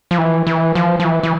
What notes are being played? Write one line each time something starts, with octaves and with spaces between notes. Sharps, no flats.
F3
E3
E3
F3
F3
E3
E3